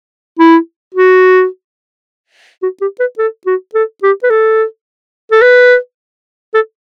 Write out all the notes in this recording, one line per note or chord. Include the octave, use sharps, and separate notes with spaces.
E4
F#4
F#4
G4
B4
A4
F#4
A4
G4
B4
A4
A4
B4
A4